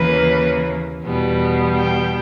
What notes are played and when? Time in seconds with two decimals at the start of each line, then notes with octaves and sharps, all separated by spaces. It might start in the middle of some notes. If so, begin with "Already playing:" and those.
Already playing: D#2 C#3 E3 A#3 B4
1.02 E2 B2 G3 B3
1.76 G5